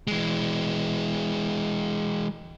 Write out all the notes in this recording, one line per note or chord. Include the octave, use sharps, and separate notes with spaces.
E3 G#3